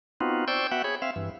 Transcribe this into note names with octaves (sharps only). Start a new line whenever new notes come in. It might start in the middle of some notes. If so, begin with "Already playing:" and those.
B3 C4 D#4 F4 F#4
C5 D5 G5 C#6 E6 G6
B3 F#4 E5 F#5 G5
G#4 C#5 B5
C4 E5 F5
G2 E3